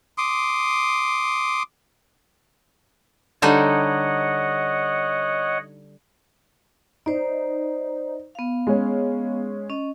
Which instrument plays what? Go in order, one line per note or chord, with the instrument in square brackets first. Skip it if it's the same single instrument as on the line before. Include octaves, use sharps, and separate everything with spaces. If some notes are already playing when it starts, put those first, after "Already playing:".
[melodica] C6 D6 D#6
[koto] D3 G3 D#4 [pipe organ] C#5 D#5 F#5
[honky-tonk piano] D#4 [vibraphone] C5 D5
[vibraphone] B3 F5
[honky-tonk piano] G#3 C#4
[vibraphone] C#4 D#5